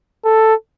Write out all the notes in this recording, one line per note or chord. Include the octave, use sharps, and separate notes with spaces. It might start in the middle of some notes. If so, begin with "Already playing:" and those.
A4